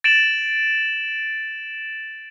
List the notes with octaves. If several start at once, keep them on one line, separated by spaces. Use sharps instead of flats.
A6 D7 E7 F#7